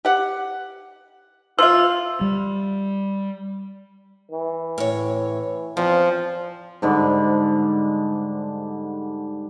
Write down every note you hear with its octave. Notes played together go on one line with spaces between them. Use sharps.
G4 F#5
F3 F4 E5 E6
G3
E3
A2 C#5
E2 F3 C4
G#2 D3 G3